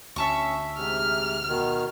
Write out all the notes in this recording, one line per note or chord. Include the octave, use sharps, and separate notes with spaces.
D2 C#4 E5 A5 C#6
G#2 C3 F6
B2 D#3